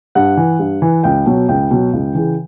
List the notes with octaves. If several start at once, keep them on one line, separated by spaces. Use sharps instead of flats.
G2 F#5
E3
G2
E3
C#2 G5
B2 F#3
C#2 G5
B2 F#3
C#2
C#3 E3